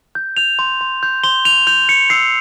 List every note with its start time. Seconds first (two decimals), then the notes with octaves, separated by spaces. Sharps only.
0.15 G6
0.37 G6 F7
0.59 C6
0.81 C6
1.03 G6
1.23 C6 G7
1.45 G6 F7
1.67 G6 F7
1.89 G6 C#7
2.10 E6 C7